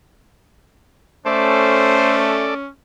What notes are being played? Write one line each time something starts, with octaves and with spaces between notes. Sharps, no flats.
A3 C#4 A4 C5 D5